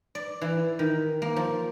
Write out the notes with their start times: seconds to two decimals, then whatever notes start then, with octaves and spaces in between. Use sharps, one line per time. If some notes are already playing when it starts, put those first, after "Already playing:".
0.15 D5
0.41 E3
0.79 D#3
1.22 A#3
1.36 F3